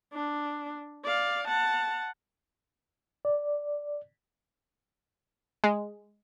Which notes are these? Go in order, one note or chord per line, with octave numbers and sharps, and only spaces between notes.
D4
D5 F5
F#5 A5
D5
G#3